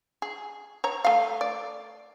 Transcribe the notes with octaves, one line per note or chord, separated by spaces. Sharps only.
G#4
C#5 A#5
A3 F5
D5